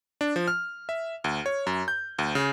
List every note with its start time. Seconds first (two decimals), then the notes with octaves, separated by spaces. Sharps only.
0.21 D4
0.36 F3
0.48 F6
0.89 E5
1.24 D2
1.46 C#5
1.67 F#2
1.88 G6
2.18 D2
2.35 C#3